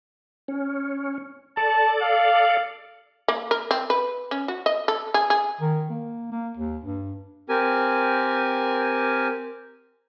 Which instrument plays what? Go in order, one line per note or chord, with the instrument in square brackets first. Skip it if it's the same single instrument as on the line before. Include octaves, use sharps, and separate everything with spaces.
[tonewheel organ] C#4
[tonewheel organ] A4 D5 [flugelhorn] A5
[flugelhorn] F5
[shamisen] A#3
A#4
C4
B4
C#4
F#4
D#5
A4
G#4
G#4
[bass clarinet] D#3
A#3
A#3
D#2
G2
[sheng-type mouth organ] C4 G4 A#4 G#5